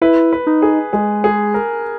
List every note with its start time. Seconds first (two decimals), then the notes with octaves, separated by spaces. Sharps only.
0.02 E4 B4
0.33 B4
0.47 D#4
0.62 G#4
0.93 G#3 G#4
1.24 G#4
1.54 A#4